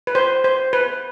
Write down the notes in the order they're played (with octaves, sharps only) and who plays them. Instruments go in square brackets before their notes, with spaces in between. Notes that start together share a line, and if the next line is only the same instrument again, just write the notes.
[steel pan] B4
C5
C5
B4